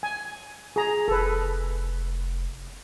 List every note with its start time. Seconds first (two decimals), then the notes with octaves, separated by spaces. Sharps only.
0.03 G#5
0.76 G#4 A#5
1.08 F1 A4 B4